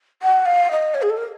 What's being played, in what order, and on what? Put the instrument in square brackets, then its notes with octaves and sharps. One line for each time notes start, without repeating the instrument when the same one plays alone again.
[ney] F#5
F5
D#5
C#5
G#4
A4
A#4